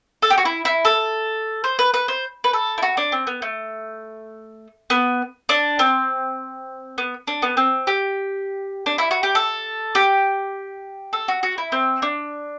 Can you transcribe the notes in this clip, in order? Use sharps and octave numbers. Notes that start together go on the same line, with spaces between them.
A4
G4
F#4
E4
E4
A4
C5
B4
B4
C5
B4
A4
E4
F#4
D4
C4
B3
A3
B3
D4
C4
B3
D4
B3
C4
G4
D4
E4
F#4
G4
A4
G4
A4
F#4
F#4
E4
C4
D4